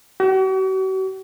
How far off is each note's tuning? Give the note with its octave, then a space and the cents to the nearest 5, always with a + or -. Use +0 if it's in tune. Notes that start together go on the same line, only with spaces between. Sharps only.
F#4 +45